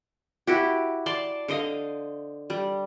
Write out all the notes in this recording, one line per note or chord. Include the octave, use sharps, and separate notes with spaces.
E4 F#4 G4
D5 A5 C6
D3 C5 D#5 F5
G3